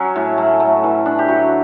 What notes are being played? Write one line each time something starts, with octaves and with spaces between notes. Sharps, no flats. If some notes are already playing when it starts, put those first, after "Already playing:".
Already playing: F#3 C#4
A2
A3
A3
E3
D4
G4
F#3 F#4